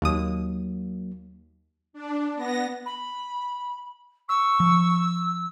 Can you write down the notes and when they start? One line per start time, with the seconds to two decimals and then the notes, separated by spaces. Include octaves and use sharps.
0.02 D#2 F#3 A#3 D#6
1.93 D4
2.35 B3 A#6
2.86 B5
4.29 C#6 E6
4.60 F3